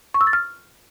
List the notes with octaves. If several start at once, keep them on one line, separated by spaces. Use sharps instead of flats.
C#6
E6
A6
F6